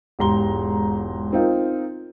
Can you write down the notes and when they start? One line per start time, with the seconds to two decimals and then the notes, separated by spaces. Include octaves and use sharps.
0.19 E1 G#2 G4 A#5 C6 G7
1.33 C4 D#4 F4 A#4